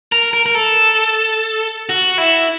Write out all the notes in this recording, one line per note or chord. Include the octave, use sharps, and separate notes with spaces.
A#4
A#4
A#4
A4
F#4
E4